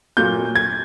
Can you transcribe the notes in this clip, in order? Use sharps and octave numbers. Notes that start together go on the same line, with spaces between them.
A#2 F#3 A#3 G6
G#6